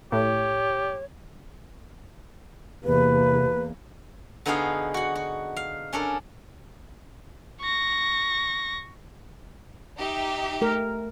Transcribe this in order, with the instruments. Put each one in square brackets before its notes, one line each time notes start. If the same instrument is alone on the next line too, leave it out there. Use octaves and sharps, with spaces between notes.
[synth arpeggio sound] A2 [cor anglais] G4 [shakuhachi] C#5
[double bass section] E2 A#3 [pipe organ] C3 [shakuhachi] B4
[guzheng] D3 B3 D#4 F#4 G#4 F5
F#4 F#5
F#4
F5
C#4 D4 A4 A#4
[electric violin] C#6 A#6
[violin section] D#4 G4 E5
[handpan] A3 A#4